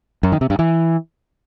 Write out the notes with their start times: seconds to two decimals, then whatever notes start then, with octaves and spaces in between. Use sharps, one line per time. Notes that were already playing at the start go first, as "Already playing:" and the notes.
0.23 F#2
0.32 D#3
0.41 C3
0.50 G2
0.59 E3